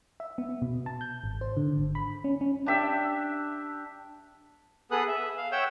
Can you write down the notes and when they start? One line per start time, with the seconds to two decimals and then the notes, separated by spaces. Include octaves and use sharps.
0.20 E5
0.38 B3
0.62 B2
0.86 A5
1.01 G6
1.24 G#1
1.41 C5
1.57 D3
1.77 G#1
1.95 B5
2.24 C#4
2.41 C#4
2.66 D4 G4 E5 G5
4.91 B3 G#4 A4 B4 D#6 F#6
5.08 E5
5.38 F5
5.52 C#5 E5 F#5 G5 E6 G6